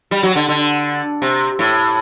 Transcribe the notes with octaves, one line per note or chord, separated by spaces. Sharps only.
G3
F#3
D3
D3
C3
A2